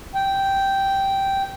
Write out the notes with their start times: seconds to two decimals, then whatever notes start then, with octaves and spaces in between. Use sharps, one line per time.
0.15 G5